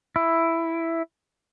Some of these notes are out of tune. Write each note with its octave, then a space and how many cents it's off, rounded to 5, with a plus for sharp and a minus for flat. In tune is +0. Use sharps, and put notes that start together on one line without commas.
E4 +5